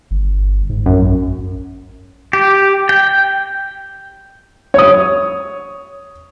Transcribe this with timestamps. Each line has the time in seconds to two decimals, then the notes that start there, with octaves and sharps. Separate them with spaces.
0.11 G1
0.69 G#2
0.86 A#1 F#2
2.33 G4
2.89 G5
4.74 C#5 D#6